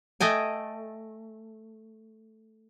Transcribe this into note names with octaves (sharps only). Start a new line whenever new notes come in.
A3 D#5 G5 G#5